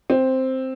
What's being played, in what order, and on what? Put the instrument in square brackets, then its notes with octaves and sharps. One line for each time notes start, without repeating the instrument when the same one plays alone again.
[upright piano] C4